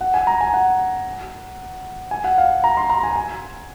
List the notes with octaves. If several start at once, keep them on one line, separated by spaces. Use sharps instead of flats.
F#5
G#5
A#5
G#5
F#5
G#5
F#5
F5
A#5
C6
A#5
G#5
G#5